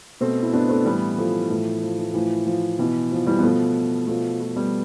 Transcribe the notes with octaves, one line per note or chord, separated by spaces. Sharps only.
B2 A3 C4
E4
B3 D4
A3 C4
A2 E3 G3 B3
F3 A3
A2 E3
F3
E3
A2 E3 F3
F3
B2 E3
F3
E3 G3
B3
B2 F3 A3
B2 F3 A3
F3 A3
G3 B3